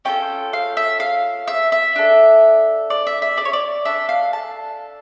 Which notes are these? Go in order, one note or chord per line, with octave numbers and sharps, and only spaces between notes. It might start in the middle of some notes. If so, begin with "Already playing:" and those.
C#4 F4 A4 G5
F5
E5
F5
E5
E5
D4 A4
D5
E5
E5
D5
C#5
D5
D4 A4 E5
F5
A5